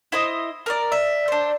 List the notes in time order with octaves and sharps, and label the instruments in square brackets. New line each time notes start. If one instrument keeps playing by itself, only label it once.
[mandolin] E4 C5 D#5
A#4 C5 D5
[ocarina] D5 [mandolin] E5
[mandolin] D4 C5